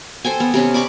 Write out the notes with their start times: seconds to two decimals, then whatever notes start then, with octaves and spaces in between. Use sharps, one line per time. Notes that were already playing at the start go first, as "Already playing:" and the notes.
0.24 A4 C5 G5 G#5
0.40 B3
0.54 C3 B3 C#4
0.74 D5 B5 C#6 D6